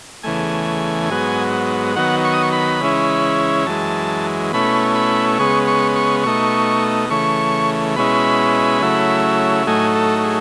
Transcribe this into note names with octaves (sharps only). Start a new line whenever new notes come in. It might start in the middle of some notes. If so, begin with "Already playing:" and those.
E2 C#3 E3 A3 G#5
G#2 F#3 B3
D#3 F#3 B3 F#5
C#6
D#6
C#6
B5
C#3 E3 G#3 C#4 E4
F#2 E3 G#3 A5
B2 A3 C#4 E4 B5
B5
C#3 G#3 B3 C#6
C#6
C#6
B2 A3 D#4 C#6
C#3 E3 A3 C#6
B2 G#3 C#4 E4 B5
C#3 F#3 A3 E4
A2 F#3 A3 D#4 G#5
A4
G#4